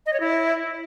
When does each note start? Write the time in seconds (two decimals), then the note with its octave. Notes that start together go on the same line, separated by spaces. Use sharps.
0.06 D#5
0.13 C#5
0.20 E4